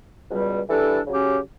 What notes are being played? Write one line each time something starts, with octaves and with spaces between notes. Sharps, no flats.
C#2 B2 G3
E3 G3 D4 A4
C#3 F#3 C#4 G4